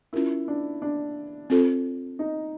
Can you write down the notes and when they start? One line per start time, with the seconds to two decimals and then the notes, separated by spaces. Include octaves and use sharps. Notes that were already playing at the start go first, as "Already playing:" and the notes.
0.13 C#4 E4 F4 A#4
0.48 D4
0.82 D4
1.50 C4 F4 A4 C5
2.19 D#4